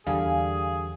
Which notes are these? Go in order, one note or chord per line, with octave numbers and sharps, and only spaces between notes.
E2 D3 E3 G3 G#4 F5 G#5